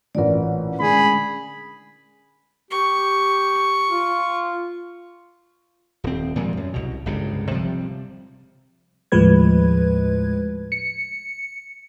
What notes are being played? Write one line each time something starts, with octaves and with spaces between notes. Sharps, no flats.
A1 A#2 D3 A#4 D5
D3 G#3 C#4 G#4 B5
G4 C#6
F4
D#1 C4
A#2 F3 G3 G#3
F#2
C2 B2
G1 C#2 C3
C3 F3 G3
D#2 A2 F3 G#3 B4 G#6
C#7